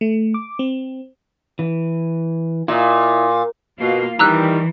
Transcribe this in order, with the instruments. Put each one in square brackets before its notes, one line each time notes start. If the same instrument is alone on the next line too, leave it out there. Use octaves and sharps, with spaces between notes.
[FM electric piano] A3
D6
C4
[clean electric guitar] E3
[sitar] A#2 [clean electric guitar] E4 D#5
[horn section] B2 [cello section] A#3 F4 F5
[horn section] D#3 G3 [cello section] E3 [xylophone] A#5 E6 F#6